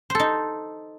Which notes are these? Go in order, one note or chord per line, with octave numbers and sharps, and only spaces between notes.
D#4 A4 C5